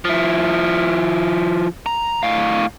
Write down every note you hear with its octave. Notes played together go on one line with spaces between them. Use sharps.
F3 E4
A#5
A2 F5